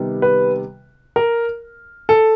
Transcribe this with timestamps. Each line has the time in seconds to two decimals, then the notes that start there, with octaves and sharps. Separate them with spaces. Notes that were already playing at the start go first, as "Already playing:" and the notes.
Already playing: C3 D#3 G3 B3
0.22 B4
1.16 A#4
2.09 A4